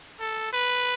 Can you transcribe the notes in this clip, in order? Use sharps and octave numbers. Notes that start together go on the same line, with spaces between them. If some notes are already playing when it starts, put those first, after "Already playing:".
A4
B4